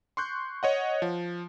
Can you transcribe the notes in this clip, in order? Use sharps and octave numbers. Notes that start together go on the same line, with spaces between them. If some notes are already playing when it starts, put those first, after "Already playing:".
C6 C#6 F#6 G6
C#5 D#5 F#5
F3